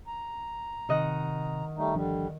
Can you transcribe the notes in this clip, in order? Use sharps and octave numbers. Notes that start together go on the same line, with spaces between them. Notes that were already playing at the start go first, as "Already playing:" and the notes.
A#5
C3 D#3 D#5 F#5
G3 A3 D#4
G1 D3 F3 G3 D4